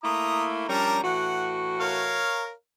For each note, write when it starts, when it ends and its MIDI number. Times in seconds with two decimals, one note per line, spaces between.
0.04 0.68 57
0.04 0.68 58
0.04 0.68 64
0.04 0.47 82
0.04 0.47 87
0.68 1.02 53
0.68 1.02 55
0.68 1.02 61
0.68 0.98 62
0.68 0.98 70
0.68 0.98 82
1.03 2.31 45
1.03 2.31 52
1.03 2.31 66
1.03 1.54 78
1.80 2.51 70
1.80 2.51 73
1.80 2.51 77